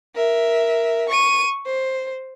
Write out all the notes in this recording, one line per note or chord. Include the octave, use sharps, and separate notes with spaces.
A#4 E5
C#6 D#7
C5